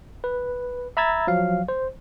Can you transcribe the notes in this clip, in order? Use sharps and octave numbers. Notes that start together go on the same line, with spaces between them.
B4
E5 A#5 B5 E6 G#6 A6
F3 F#3 F5
C5